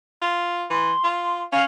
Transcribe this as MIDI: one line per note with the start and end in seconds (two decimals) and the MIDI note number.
0.22 0.65 65
0.70 0.93 52
0.70 1.42 84
1.04 1.44 65
1.52 1.64 61
1.52 1.63 77